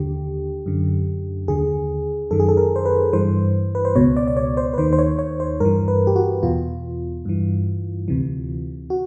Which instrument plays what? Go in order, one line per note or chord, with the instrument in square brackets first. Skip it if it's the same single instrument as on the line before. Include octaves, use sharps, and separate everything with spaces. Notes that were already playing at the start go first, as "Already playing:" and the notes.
Already playing: [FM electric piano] D#2 D3 G4
F#2 D3
D#2 D3 G#4
F#2 D#3 A4
G#4
A4
A#4
C5
B4
G2 E3 C5
B4
C5
C#2 B2 C#5
D5
D5
C#5
C5
B4
D#2 D#3 C5
C5
C#5
C#5
C5
G2 E3 A#4
B4
G4
F#4
E2 B2 F4
G2 E3
D2 C3 E3
F#4